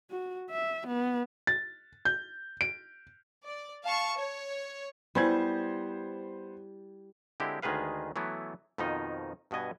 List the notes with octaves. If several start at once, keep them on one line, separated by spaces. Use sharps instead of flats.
F#4
E5
B3
A6
G6
D7
D5
F5 A5 C#6
C#5
G3 B3 E4 C5 G#5 G#6
D3 G#3 C4 E4 G4
D2 D#3 G#3 G#4 B4 F5
E3 F#3 A3 B3 E4
F2 B2 D#3 F3 D#4 D#5
G2 B2 B3 D#5 G#5